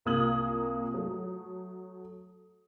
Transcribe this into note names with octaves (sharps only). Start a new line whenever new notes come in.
C2 A#3 F4 D#6 G#6 F#7
F#3 A3